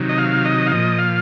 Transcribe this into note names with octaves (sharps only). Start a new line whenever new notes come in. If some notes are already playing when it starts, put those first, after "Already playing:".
Already playing: C3 D#3 F#3
D#5
F5
D#5
F5
A#2 F3 D#5
F5